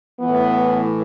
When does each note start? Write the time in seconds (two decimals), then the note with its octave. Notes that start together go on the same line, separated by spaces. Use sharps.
0.20 A2 E3 B3